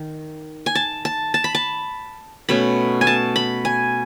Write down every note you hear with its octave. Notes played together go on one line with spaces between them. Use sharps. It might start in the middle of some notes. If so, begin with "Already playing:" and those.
Already playing: D#3
G#5
A5
A5
A5
B5
A5
B2 A3 C#4 B5
G#5
A5
B5
G#5